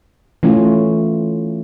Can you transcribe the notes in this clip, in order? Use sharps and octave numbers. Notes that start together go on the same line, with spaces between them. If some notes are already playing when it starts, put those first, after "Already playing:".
E3 A3 C#4 F4